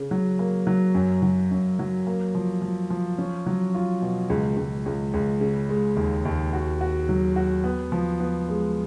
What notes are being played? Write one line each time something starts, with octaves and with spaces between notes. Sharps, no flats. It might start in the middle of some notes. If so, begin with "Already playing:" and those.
Already playing: C#3
F#3
A#3
F#3
F#2
F#3
F#2
F#3
A#3
F3
F3
F3
C#4
F#3
F4
B2
C#2
C#2
C#2
C#2
C#3
G#3
D#2
D#2
F#4
F#4
F#3
F#4
B3
F3
B3
G#3